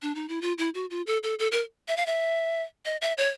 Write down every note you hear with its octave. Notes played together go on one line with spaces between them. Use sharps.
D4
D#4
E4
F4
E4
F#4
F4
A4
A4
A4
A#4
E5
F5
E5
D#5
E5
C#5